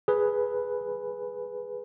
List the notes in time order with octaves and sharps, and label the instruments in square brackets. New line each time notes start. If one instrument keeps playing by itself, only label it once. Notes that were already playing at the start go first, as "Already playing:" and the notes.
[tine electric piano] G#4 B4